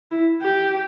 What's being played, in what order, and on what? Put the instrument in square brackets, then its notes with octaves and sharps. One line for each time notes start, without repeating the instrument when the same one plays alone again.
[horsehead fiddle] E4
G4